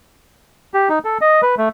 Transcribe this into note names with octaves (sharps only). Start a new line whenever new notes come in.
G4
D#4
A4
D#5
B4
A3